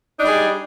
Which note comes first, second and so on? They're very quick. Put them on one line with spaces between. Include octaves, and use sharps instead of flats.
D#4 D4 G3 G#4